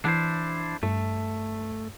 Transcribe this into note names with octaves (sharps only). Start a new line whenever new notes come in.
E3 D4 E4 C5
G2 A3